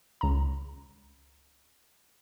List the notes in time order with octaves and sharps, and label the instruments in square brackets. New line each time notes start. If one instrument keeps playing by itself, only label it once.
[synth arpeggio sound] C#2 A#5